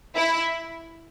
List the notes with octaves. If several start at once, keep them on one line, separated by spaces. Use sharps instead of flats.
E4